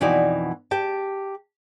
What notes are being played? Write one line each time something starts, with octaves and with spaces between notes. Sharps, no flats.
F2 B2 E3 D#4 F#4 D5
G4 G5 A5